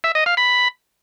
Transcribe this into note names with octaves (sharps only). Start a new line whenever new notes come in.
E5
D#5
F5
B5